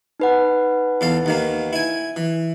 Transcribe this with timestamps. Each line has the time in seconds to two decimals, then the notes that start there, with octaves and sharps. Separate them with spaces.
0.20 D#4 B4 F#5
1.01 E2 A4 F5
1.26 D#2 D#3 A#3
1.73 E4 G#5
2.16 E3